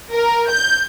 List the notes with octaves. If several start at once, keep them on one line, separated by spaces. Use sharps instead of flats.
A#4
G6